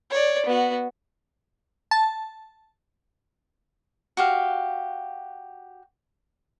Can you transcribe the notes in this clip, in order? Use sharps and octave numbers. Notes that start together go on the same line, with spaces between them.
C#5 D5
B3 F#4
A5
F#4 G4 F5